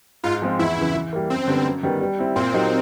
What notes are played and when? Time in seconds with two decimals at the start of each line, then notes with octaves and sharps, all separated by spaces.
0.24 G#2 F4
0.42 F3 G#3 C4 F4
0.59 E2 E4
0.77 C#3 E3
0.95 E3
1.13 G3 A#3
1.30 F#2 C4
1.47 D3 G3 B3
1.65 F#2
1.83 D#3 G3 B3
2.01 G3
2.19 C4 E4
2.36 A#2 C4
2.53 F#3 A#3 D#4 G4